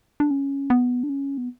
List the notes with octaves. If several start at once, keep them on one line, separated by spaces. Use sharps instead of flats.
D4
C#4
B3
D4
C#4
B3